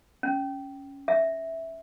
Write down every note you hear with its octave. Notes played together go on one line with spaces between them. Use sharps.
C#4
E5